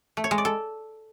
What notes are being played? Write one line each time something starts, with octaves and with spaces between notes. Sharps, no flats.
A3
C#5
G#3
D5
A4